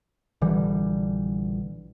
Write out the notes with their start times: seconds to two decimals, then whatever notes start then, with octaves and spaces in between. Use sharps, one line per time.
0.41 A#1 D3 E3 G3